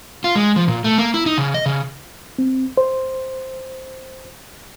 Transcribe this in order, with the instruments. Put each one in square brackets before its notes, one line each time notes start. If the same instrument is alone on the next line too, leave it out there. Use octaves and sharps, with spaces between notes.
[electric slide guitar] F4
G#3
F3
A#2
A3
A#3
E4
D#4
C#3
D#5
C#3
[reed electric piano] C4
C5